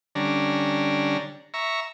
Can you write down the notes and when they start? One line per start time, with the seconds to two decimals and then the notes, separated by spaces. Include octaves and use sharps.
0.15 D3 G3 C#4 D4 A#5
1.54 E5 A#5 C#6